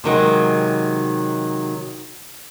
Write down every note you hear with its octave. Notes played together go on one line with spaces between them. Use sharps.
C3 D#3 F#3 G#3